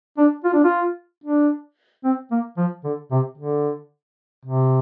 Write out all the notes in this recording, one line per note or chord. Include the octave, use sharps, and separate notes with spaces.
D4
F4
D4
F4
D4
C4
A#3
F3
D3
C3
D3
C3